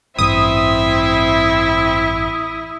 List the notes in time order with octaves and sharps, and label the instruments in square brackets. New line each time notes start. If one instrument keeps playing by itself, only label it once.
[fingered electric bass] A1 G2 [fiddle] C4 E5 [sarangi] E4 [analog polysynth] D#6